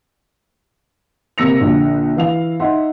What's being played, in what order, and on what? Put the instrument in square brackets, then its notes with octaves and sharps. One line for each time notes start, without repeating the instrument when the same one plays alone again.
[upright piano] C3 A#3 E6 A#6 C#7 F7
A#1 D3
E3 F5 F7
D#4 E5 F#5 C6